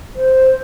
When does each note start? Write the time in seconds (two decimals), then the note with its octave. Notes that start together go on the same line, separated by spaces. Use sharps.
0.16 C5